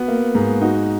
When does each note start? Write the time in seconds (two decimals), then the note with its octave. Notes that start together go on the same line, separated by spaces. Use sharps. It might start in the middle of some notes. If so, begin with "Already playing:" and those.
Already playing: B3 F#4
0.08 A#3
0.35 G#2
0.61 D#4 F#4